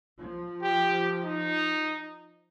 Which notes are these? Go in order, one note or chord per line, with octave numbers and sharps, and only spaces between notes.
F3
G4
D#4